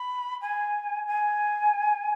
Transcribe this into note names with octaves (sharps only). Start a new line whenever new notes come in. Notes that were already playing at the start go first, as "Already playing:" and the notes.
Already playing: B5
G#5
G#5